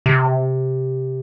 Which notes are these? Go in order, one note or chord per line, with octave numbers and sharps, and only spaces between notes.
C3